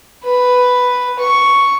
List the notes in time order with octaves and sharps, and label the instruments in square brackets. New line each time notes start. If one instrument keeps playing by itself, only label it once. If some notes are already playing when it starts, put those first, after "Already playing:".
[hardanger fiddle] B4
C#6